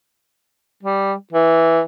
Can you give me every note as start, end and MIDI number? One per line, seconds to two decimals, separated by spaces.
0.83 1.14 55
1.33 1.81 52